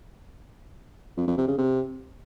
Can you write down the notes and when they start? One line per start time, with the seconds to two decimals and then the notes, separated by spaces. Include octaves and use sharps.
1.17 F2
1.27 F2
1.38 C3
1.48 C#3
1.58 C3